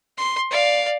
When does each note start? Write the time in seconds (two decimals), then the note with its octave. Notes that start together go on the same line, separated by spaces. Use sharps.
0.18 C6
0.51 D5 F5